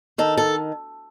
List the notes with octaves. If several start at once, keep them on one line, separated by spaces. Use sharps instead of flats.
D#3 A4
A4